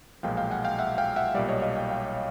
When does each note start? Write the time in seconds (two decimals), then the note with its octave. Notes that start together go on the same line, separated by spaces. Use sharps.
0.23 B1 A#2 F3 G#3 F5 G5
0.37 F5 G5
0.51 F#5 G#5
0.64 F5 G5
0.79 E5 F#5
0.98 F5 G5
1.16 E5 F#5
1.34 B1 A#2 G3 D5 E5
1.48 C#5 D#5
1.62 D#5 F5
1.76 F5 G5
1.90 F5 G5